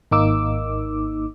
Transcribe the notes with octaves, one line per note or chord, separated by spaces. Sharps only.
G#1 A#3 D#4 D6 E6